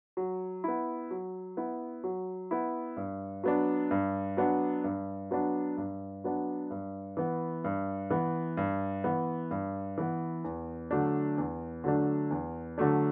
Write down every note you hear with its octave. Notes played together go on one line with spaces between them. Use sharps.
F#3
B3 E4
F#3
B3 E4
F#3
B3 E4
G2
F#3 B3 D4
G2
F#3 B3 D4
G2
F#3 B3 D4
G2
F#3 B3 D4
G2
E3 B3
G2
E3 B3
G2
E3 B3
G2
E3 B3
E2
D3 F#3 A3 D4
E2
D3 F#3 A3 D4
E2
D3 F#3 A3 D4